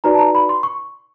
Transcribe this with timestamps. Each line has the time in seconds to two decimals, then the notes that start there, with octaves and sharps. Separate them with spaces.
0.04 D#4 F#4 B4 D5 A#5
0.14 A5
0.18 A#5
0.35 B5
0.49 C6
0.63 C#6